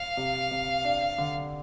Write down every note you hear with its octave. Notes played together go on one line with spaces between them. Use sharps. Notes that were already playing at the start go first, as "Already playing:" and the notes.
Already playing: F5
C3
C3
D4
D3